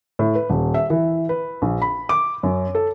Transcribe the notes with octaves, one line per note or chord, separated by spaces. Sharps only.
A2
B4
D#1
E5
E3
B4
A#1
B5
D6
F#2
A4